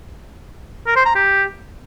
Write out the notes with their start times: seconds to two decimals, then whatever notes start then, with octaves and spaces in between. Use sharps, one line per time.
0.87 A#4
0.96 C5
1.06 A#5
1.15 G4